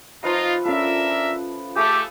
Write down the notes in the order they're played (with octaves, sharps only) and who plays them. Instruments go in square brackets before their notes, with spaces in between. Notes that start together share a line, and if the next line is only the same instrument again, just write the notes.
[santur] F3 B4 E5 [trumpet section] D#4 F4
[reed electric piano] C#4 F4 [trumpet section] D4 A#4 E5 [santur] A4
[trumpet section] A3 [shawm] G4 [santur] G#4